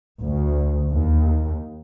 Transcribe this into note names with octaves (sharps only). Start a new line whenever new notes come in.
D2
D#2